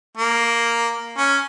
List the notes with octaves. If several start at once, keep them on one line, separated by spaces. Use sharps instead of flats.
A#3
C#4